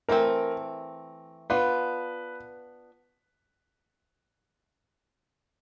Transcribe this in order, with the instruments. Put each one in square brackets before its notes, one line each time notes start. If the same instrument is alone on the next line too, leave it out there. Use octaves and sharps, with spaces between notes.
[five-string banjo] E3 A3 C4 [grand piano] A#4
[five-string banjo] B3 D4 F4 [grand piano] B4